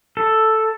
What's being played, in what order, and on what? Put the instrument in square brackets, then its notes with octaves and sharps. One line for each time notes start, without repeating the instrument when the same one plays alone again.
[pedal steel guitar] A4